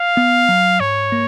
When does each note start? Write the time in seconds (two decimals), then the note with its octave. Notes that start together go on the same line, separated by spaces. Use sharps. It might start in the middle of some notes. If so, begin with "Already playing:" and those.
Already playing: F5
0.17 B3
0.49 F#3
0.80 G#2 C#5
1.12 A#3